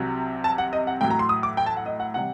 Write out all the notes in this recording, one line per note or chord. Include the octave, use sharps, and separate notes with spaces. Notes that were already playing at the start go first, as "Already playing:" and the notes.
Already playing: C2 C3 F#3
A5
F#5
D#5
F#5
A2 F#3 G5
A#5
C6
D#6
D6
G5
A5
F#5
D#5
F#5
C3 G3 F#5